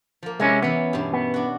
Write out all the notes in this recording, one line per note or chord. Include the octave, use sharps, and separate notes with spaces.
F3 A#3
C3 G#3 C#4 E4
E3 B3 C#4
G2 B2
B3
D4 F#4